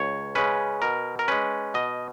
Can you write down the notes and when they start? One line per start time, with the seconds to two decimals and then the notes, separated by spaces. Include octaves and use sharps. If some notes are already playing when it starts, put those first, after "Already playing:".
Already playing: C#2 C#5
0.35 C#3 G#3 C#4 B4
0.82 B2 A#4
1.19 A#4
1.28 G#3 C#4 B4
1.74 B2 D#5